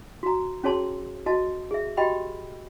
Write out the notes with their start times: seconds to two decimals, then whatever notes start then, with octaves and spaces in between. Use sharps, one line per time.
0.23 F#4 A#5
0.64 C#4 F#4 G#4 C#5 A5 C6
1.26 F#4 D#5 A5
1.71 G#4 E5
1.97 F#4 G4 D#5 G5 B5